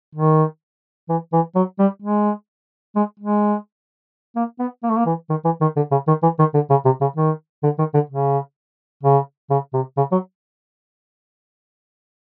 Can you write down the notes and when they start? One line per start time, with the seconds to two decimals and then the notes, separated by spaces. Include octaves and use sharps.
0.15 D#3
1.09 E3
1.33 E3
1.55 F#3
1.79 G3
2.02 G#3
2.96 G#3
3.20 G#3
4.36 A#3
4.59 B3
4.83 A#3
4.90 A3
4.97 A#3
5.06 E3
5.30 D#3
5.45 E3
5.61 D#3
5.77 D3
5.92 C#3
6.08 D#3
6.23 E3
6.39 D#3
6.54 D3
6.70 C#3
6.85 C3
7.01 C#3
7.17 D#3
7.64 D3
7.79 D#3
7.94 D3
8.10 C#3
9.03 C#3
9.50 C#3
9.74 C3
9.97 C#3
10.12 F#3